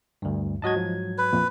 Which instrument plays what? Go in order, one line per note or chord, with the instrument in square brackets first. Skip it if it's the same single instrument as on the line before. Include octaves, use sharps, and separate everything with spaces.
[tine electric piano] D2 G2
[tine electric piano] G#2 F#3 G#6 [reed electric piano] F#4 D#5 A5
[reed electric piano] F3
[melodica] B4
[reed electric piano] F2 A#2